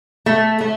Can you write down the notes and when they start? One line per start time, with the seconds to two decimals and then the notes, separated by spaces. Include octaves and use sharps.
0.26 A3
0.61 A3